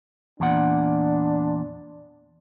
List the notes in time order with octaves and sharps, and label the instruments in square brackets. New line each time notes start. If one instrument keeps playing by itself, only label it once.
[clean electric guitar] E2 A#2 F#5 [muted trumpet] D4